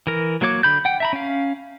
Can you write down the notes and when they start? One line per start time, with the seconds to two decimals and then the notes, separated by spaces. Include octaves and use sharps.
0.07 E3 A#4
0.41 F#3 A#3 F#4 C#5 D6
0.63 D3 B5 G6
0.85 F#5 G5
1.00 E5 A#5 B5
1.13 C#4 F5